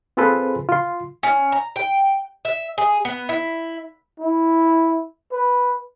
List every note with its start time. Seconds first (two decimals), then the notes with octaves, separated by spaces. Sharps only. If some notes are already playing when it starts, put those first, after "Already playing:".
0.17 C4 F4 G#4 A4 B4 C5
0.69 F4 C6
1.23 C#4
1.52 A#5
1.76 G5
2.45 E5
2.78 G#4
3.05 B3
3.29 E4
4.20 E4
5.32 B4